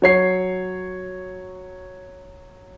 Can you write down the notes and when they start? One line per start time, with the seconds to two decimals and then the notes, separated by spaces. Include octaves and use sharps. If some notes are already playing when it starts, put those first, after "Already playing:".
0.02 F#3 C#5 C7